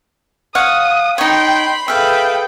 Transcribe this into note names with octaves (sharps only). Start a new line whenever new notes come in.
C#5 F5 F#5 D#6
D#4 C#5 G5 B5 C6
G#4 A4 B4 E5 F5 G5